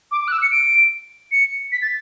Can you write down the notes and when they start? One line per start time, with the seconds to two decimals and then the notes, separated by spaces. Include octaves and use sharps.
0.12 D6
0.22 D6
0.28 F#6
0.32 E6
0.42 C#7
0.52 D7
1.32 C#7
1.72 B6
1.82 A6